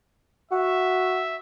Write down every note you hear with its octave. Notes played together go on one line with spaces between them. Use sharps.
F#4 E5